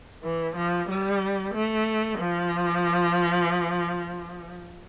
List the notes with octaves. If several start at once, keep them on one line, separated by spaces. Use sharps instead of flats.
E3
F3
G3
A3
F3